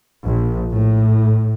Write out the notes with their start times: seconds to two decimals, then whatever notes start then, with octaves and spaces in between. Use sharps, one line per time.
0.23 A#1
0.72 A2